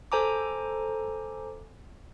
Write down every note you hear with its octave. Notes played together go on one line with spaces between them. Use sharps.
A4 C5 G#5 A#5 D6